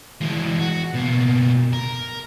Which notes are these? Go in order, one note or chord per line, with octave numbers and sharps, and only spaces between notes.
E3 G#3
F#4
B2 A#3
A#4